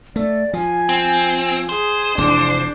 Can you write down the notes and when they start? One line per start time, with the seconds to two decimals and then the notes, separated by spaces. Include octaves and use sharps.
0.16 A3 D5
0.53 F3 G#5
0.89 C4
1.69 G#4 C5
2.18 F1 F2 E3 D4 D6